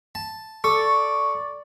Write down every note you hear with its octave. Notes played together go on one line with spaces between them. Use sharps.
A5
A4 D5 C#6